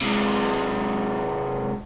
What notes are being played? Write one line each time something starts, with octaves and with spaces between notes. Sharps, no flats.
C3 G#3